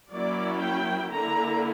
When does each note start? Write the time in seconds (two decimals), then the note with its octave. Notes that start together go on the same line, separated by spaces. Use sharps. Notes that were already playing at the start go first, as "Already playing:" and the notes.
0.11 F#3 A#3 C#4 E4 D5
0.61 G5
1.11 D3 A#3 E4 A#5